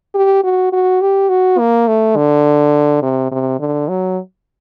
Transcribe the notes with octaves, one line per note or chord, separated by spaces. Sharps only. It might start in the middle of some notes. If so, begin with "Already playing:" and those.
G4
F#4
F#4
G4
F#4
A#3
A3
D3
C3
C3
D3
F#3